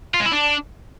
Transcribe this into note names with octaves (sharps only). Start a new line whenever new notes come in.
F4
G#3
E4
D4